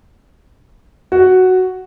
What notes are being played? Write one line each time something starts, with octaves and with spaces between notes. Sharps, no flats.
F#4